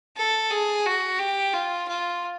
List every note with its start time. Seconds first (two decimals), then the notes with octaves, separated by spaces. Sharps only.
0.17 A4
0.51 G#4
0.85 F#4
1.19 G4
1.53 F4
1.88 F4